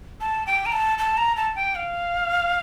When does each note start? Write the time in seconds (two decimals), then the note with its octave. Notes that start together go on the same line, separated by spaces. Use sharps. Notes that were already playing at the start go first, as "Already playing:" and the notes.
0.21 A5
0.47 G5
0.66 A#5
0.72 A5
0.98 A5
1.17 A#5
1.37 A5
1.56 G5
1.75 F5